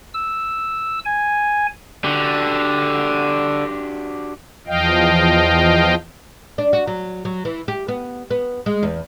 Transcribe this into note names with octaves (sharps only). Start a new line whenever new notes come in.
E6
G#5
D3 D4 F#4 G4
E2 F3 D#5 F5 G5
D4
F#4
F#3
F#3
E3
G4
B3
B3
G#3
E2